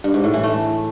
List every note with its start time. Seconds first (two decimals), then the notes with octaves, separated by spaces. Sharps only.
0.04 G2
0.14 G#2
0.24 A2
0.34 E3
0.43 A3